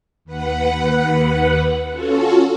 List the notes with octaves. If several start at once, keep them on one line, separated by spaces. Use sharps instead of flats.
D#2 B4 F#5
C#4 F4 F#4 A4